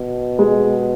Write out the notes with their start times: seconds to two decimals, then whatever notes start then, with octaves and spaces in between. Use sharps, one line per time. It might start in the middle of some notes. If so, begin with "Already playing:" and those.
Already playing: B2
0.39 G#3